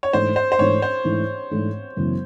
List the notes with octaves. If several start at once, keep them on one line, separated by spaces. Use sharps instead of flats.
C#5
G#2 E3 A3 D4 C5
C5
C5
G#2 E3 A3 D4 C#5
C5
G#2 E3 A3 D4
G#2 E3 A3 D4
F#2 C#3 E3 G#3 B3